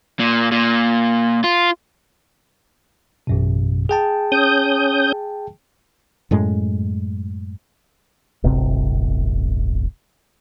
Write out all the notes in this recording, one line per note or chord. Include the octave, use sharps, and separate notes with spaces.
A#2
A#2
F4
A1 F#2 B2
G#4 G5 A5
C#4 D#6 G6
F#2 A2 G#3
D1 G1 C3 C4